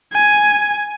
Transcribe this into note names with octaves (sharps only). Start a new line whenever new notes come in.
G#5